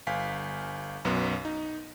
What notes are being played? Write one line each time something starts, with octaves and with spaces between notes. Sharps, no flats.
G1 F5 G#5 B6
B1 F#2 B3
D#4